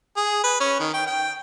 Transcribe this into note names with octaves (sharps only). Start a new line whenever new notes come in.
G#4
B4
C#4
D#3
G5
G5